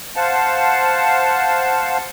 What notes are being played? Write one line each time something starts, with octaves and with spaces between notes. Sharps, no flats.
C5 F5 F#5 A5